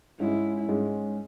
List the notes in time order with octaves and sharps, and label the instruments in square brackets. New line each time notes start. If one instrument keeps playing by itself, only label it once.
[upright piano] G#2 G#3 C#4 [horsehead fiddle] E4
[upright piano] G#2 G#3 C#4